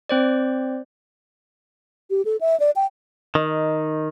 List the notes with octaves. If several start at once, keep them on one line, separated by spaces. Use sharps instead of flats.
C4 C5 D5
G4
A4
E5
D5
G5
D#3 D#4